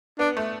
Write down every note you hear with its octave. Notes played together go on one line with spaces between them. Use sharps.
B3 D4
A3